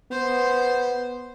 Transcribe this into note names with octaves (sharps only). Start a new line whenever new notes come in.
B3 C5